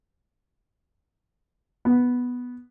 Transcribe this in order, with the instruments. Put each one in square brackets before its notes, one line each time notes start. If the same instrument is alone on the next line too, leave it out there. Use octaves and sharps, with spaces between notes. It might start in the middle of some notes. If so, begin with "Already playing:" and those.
[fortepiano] B3